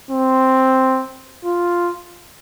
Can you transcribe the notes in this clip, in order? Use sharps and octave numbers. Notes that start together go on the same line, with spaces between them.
C4
F4